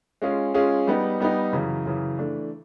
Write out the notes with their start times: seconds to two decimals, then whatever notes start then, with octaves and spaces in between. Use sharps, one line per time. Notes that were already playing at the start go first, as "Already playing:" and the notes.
0.22 G#3 C#4 F4 G#4
0.54 G#3 C#4 F4 G#4
0.87 G3 B3 D#4
1.20 G3 B3 D#4
1.53 F#2 C#3 E3
1.86 F#2 C#3 E3
2.19 E3 A3 D4